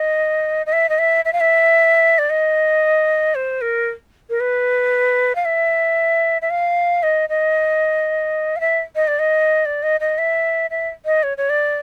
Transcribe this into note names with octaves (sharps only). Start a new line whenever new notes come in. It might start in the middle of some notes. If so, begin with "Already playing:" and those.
Already playing: D#5
D#5
E5
D#5
E5
E5
F5
E5
D5
D#5
C5
A#4
A#4
B4
F5
E5
E5
F5
D#5
D#5
F5
E5
D#5
D5
D#5
D5
D#5
D#5
E5
E5
D#5
C#5
C#5
D5